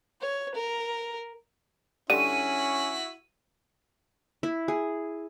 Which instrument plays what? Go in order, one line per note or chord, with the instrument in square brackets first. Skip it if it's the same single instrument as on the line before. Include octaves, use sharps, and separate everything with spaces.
[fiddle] C#5
A#4
[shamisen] D3 G3 [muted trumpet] C#4 [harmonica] E4 F#4 C#6 [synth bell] D#7
[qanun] E4
G#4